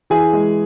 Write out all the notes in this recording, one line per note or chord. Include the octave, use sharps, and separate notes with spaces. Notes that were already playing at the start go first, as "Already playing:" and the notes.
E3 G#4 G#5
G#3